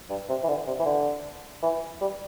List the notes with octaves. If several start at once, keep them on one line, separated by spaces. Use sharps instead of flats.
G2
C3
E3
D3
C3
E3
D3
E3
G3